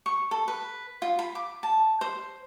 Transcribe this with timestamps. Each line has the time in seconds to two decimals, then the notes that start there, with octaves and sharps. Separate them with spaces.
0.06 C#6
0.31 A4
0.48 B4
1.02 F4
1.19 B5
1.35 D6
1.63 A5
2.01 C5